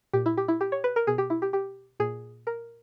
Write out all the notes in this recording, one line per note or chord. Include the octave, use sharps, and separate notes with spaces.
A#2 G4
E4
G4
E4
G4
C#5
B4
A#4
B2 G#4
G4
E4
G4
G4
A#2 G#4
A#4